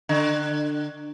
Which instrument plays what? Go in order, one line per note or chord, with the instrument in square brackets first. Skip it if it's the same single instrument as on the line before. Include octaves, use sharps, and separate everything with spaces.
[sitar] D3